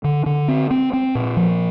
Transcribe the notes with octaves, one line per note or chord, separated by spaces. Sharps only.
D3
D3
C4
C4
C4
A#2
F3